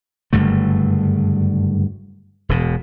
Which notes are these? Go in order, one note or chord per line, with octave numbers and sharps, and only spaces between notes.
F#1 G2 D3 A3
E1 B2